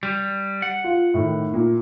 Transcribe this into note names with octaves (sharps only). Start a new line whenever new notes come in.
G3
F#5
F4
A2 D#3
A#2